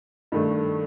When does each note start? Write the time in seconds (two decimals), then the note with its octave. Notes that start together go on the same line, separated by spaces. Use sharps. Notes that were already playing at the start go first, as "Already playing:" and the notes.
0.32 G2 D#3 A3